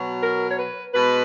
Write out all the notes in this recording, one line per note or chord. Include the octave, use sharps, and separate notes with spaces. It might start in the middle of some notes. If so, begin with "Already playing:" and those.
Already playing: B2 F#3
A#4
C#5
B4
B2 G#3 B4